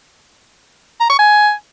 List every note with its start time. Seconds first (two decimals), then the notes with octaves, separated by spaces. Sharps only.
1.00 A#5
1.10 C#6
1.19 G#5